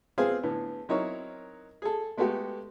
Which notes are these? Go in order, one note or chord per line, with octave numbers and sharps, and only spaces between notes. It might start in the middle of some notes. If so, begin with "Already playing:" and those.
B3 C4 F4 G#4 C5 F5
A2 D3 B3
F#3 C4 D#4 E4 A#4 C#5
G#4 A4
G#3 A3 B3 F#4 G4 A4